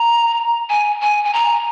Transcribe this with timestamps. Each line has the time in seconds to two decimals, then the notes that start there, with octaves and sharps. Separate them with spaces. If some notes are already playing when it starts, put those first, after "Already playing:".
Already playing: A#5
0.69 G#5
1.01 G#5
1.24 G#5
1.33 A#5